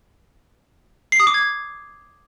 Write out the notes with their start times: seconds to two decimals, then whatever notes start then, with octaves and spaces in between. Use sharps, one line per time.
1.12 C7
1.20 D#6
1.27 D6
1.34 G#6